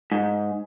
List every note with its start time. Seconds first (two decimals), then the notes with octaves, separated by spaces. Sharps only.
0.12 G#2